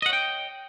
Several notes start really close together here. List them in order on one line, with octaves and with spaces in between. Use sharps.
D#5 F#5 C#5 G5